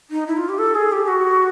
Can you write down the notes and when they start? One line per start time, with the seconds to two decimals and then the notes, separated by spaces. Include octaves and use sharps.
0.11 D#4
0.27 E4
0.37 F4
0.49 G4
0.59 A4
0.75 G#4
0.92 G4
1.08 F#4